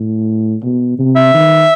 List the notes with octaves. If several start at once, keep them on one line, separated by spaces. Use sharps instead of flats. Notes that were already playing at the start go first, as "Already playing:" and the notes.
Already playing: A2
B2
C3
E5
D#3